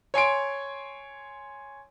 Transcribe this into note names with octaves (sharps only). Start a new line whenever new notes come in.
C#5 G#5 C6 D7